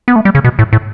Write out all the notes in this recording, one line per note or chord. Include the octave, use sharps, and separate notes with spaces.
B3
A3
G3
C#3
B2
A2
A2